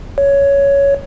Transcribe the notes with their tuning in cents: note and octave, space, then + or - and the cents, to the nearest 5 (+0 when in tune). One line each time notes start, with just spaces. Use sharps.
C#5 +10